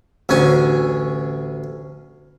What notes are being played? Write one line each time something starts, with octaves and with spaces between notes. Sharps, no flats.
A1 D2 C#4 G#5